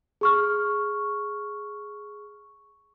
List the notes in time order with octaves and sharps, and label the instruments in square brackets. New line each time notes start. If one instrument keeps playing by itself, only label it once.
[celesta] G#4 C#6 F6